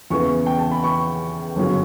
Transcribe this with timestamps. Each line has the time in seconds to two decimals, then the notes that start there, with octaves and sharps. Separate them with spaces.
0.10 E2 C#3 E3 B3 C#6
0.46 G5
0.59 A5
0.72 B5
0.84 C#6
1.56 G1 F#2 C#3 F#3 C#4